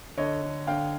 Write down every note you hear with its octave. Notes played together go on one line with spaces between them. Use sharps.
D3 C#5 D#5
D3
D3 F5 G5